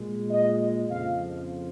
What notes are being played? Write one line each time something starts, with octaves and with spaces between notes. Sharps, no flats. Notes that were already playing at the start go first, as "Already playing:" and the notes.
Already playing: A#2 G#3
D#5
F2 C#3 F3 F5